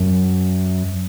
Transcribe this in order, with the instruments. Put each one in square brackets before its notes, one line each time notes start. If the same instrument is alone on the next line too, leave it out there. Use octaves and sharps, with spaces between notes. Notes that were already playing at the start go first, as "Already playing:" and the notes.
Already playing: [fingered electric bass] F#2